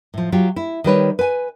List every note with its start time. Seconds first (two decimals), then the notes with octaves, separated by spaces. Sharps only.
0.14 A2 F3
0.32 F#3 F4 G4
0.56 E4
0.84 D#3 G3 B4 C#5
1.19 B4 G#5